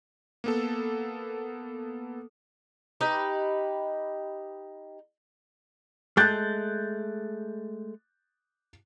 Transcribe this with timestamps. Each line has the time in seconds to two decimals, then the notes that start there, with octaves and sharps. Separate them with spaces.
0.44 A#3 B3 A4
3.01 D#4 G4 B4
6.17 G#3 A3 F#6 G6 A6